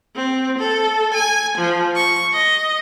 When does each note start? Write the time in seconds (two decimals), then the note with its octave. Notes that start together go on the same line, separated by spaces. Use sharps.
0.16 C4
0.59 A4
1.14 G#5
1.58 F3
1.95 C#6
2.33 D#5